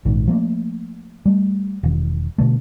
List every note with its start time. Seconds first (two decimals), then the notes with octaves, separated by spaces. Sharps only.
0.05 A#1 G#2 D#3
0.27 F3 A3 A#3
1.26 G3 A3
1.83 E1 D#3
2.38 B2 D3 A3